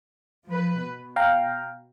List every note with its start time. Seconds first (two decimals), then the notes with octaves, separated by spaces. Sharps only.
0.47 F3 B4
0.79 B2
1.16 F5 G5 A#5